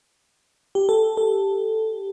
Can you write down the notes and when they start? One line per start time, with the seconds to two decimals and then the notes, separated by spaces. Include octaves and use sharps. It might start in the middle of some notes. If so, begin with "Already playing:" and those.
0.75 G4
0.89 A4
1.17 A4